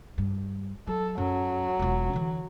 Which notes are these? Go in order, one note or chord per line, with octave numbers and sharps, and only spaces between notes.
G2
F#3 A4
F#2 F#3
E1 F4
D3 E3